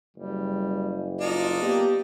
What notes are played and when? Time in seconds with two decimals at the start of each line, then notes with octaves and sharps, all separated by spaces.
0.17 F#1 G3
1.21 D4 D#4 F4
1.62 A#3 B3 G4